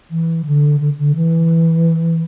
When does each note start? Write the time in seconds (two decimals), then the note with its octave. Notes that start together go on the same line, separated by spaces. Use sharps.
0.11 E3
0.46 D3
0.80 D3
0.99 D3
1.16 E3